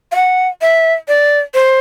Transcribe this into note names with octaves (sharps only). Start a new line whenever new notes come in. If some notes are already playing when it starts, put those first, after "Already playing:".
F5
F#5
E5
D5
C5